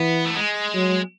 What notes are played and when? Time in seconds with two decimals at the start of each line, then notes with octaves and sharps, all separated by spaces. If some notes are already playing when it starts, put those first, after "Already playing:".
Already playing: E3 B3
0.25 A3
0.37 G#3
0.74 F#3